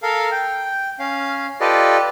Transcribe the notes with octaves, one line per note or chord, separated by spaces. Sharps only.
A4 A#4 F5
G5
C#4 F5
F4 G4 A4 B4 D5 D#5